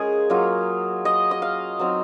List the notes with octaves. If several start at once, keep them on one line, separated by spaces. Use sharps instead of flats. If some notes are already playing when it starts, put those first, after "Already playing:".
Already playing: G#3 C#4 F4 G#4 A#4
F#3 A#3 F4
D#5
D#5
F5
F#3 C4 D#4